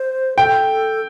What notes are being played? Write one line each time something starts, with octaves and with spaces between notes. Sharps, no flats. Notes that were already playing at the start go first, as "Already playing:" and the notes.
Already playing: C5
A4 G5